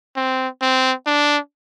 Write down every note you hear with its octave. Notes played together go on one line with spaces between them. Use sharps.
C4
C4
D4